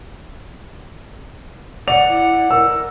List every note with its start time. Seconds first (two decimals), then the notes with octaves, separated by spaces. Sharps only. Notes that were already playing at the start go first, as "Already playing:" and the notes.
1.88 D5 F#5 F7
2.09 E4
2.51 A#4 E6